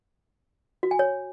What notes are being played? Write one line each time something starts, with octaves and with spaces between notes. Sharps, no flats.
F#4
G#5
C#5